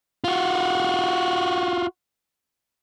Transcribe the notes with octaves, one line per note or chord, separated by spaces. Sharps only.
F4 F#4